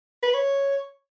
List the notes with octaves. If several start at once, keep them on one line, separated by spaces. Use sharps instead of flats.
B4
C#5